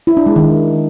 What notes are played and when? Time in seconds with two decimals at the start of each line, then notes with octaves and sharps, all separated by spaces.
0.07 E4
0.17 D4
0.26 G#3
0.36 D#3